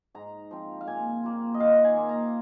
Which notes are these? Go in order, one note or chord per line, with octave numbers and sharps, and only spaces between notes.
G#2 A#5
F3 C4
F5
A#2 G#5
A#3 F4
D#5
D#3 F5
G#5
A#3 F4
A#5